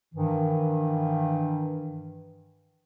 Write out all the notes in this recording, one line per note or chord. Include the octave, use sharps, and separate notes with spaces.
G2 D#3 E3